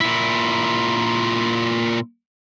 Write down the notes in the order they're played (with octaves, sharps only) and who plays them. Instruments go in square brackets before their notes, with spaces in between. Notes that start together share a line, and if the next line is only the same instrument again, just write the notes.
[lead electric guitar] A#2 E4